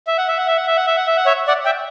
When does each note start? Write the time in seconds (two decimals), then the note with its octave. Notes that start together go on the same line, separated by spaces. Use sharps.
0.07 E5
0.18 F#5
0.28 E5
0.38 F#5
0.47 E5
0.57 F#5
0.67 E5
0.76 F#5
0.86 E5
0.97 F#5
1.07 E5
1.17 F#5
1.26 C#5 E5
1.48 D5 F#5
1.65 E5 G5